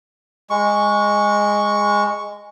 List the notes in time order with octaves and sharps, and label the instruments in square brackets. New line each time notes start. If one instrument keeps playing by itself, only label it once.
[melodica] G#3 C#6